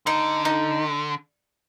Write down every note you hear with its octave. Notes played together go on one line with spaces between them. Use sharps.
D3 D#4
D#4